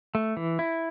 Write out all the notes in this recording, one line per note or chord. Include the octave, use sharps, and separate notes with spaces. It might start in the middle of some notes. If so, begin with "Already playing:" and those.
A3
E3
E4